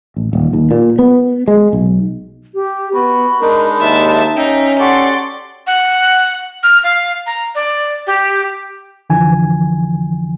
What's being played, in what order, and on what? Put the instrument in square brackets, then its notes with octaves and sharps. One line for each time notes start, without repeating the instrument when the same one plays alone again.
[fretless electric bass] A1
D#1
D#2
A#2
B3
G#3
B1
[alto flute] G4
[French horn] B3 [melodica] F#4 [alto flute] B5
[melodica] G#3 D4 D#4 [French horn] A#4
[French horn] D#2 [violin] E5 A5
[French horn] C#4 [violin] D#4 [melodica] E5 G5
[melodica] F#4 G4 A4 [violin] D5 C6 [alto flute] F#5
[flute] F#5
F6
F5
A#5
D5
G4
[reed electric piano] F2 D3 E3 F3 G#5